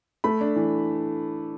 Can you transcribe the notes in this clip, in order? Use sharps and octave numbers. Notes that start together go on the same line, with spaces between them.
A3 B5
D4
E3